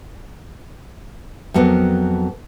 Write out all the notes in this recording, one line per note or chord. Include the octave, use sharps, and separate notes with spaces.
F2 F#3 A#3 B3